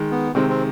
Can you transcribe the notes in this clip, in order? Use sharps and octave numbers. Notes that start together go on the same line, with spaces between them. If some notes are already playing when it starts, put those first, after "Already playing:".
Already playing: D#3 G#3
B3
C3 D#3 G#3 C4
C4